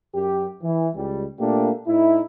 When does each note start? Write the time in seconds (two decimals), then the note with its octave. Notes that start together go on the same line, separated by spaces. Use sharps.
0.15 F#2 G4
0.63 E3
0.95 C#2 G3
1.40 A#2 A3 A#3 D4 G4
1.88 A2 D#4 E4